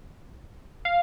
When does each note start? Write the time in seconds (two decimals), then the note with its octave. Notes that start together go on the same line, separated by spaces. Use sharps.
0.85 F5